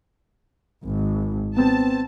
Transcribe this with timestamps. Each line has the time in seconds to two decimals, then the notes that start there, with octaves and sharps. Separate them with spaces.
0.83 G#1
1.57 B3 C4 A5